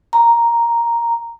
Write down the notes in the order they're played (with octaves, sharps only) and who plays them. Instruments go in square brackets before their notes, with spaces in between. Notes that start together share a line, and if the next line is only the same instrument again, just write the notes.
[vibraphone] A#5